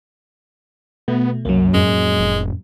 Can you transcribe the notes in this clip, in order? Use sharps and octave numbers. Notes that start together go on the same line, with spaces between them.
B2 A3 B3
C2 F#2 F#3 A#3
F2 A2 G#3 C#4
F1